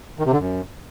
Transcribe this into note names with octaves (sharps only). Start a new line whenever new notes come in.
D#3
C3
D3
F#2